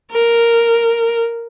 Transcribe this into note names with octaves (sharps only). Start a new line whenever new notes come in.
A#4